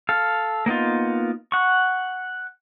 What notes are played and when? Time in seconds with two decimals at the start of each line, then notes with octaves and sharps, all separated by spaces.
0.09 A4 F5
0.66 A#3 B3 D#4 F4
1.52 F#5 C#6